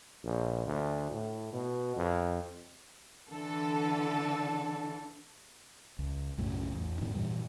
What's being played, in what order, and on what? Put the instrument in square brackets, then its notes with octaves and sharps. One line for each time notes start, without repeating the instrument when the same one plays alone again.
[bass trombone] A#1
D2
A2
B2
F2
[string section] D3 E3 A4
[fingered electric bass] C#2
B1 F#2 A2 C#3
A1 E2
E2 G#2 B2 D#3
G2 A#2 E3 G3